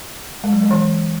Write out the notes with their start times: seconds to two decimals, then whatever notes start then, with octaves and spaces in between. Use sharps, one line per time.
0.44 G#3
0.53 F#3
0.62 G#3
0.71 E3